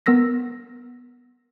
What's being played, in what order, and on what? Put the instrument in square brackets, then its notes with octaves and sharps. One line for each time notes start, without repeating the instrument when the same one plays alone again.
[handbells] B3 A#4 E6 A#6 B6